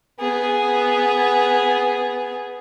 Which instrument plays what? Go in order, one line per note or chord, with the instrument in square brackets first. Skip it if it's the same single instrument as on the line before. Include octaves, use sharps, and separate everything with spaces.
[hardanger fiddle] B3 G#4